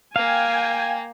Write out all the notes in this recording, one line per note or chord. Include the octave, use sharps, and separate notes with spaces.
A#3 F5 G5 G#5